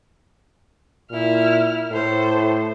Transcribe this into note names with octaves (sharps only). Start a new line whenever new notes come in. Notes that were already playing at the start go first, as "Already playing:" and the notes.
A#2 E4 F6
A2 A4 C5